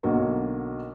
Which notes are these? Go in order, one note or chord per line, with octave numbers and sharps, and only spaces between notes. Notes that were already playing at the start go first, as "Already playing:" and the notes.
B1 D3 F#3 A#3